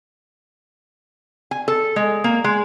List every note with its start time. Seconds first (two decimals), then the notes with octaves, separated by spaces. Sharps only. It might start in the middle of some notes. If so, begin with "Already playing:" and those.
1.51 G#5
1.68 A4
1.96 G#3
2.24 A#3
2.44 G#3